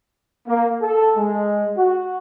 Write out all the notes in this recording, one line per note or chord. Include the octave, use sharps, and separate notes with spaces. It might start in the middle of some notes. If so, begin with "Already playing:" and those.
A#3
A4
G#3
F#4